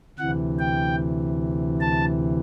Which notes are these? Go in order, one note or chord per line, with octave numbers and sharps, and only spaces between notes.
D2 C3 E3 F#5
G5
A5